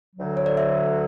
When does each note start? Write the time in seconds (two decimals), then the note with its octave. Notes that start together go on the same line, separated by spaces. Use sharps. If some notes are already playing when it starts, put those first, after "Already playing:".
0.15 D2 D3 F#3
0.37 C#5
0.46 D5
0.57 E5